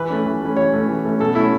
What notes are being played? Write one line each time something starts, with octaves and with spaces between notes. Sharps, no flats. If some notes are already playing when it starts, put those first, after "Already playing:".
Already playing: E3 B4
A3 C#4
E3
A3 C#4
E3 C#5
A3 C#4
E3
A3 C#4
B2 A4
A3 C#4 E4